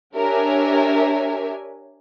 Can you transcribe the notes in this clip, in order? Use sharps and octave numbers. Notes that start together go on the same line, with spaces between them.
D4 G4 A#4 C#5 E5 G#5